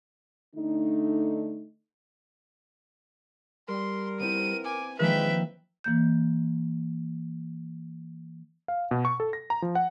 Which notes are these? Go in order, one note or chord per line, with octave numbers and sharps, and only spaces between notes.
D3 A3 D4 D#4
G3 A#4 C6
B3 C4 E4 D#7
G#5 D6
D#3 F3 G#3 A#3 B4 E5 G5
E3 A#3 G6
F5
B2
C#6
A4
A#6
A#5
F3
F#5